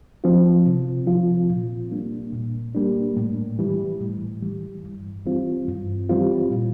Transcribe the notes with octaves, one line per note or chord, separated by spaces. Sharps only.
F3 C4 F4
C3
F3 C4 F4
A#2
G3 A#3 D4
A#2
G3 A#3 D4
A2
E3 G3
A2
E3 G3
G2
E3 G3 C4 F4
G2
E3 G3 C4 F4
A#2